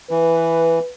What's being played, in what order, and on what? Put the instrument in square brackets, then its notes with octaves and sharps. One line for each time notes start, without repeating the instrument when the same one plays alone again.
[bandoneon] E3 [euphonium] B4